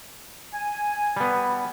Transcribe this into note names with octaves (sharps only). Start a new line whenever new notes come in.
G#5
G3 B3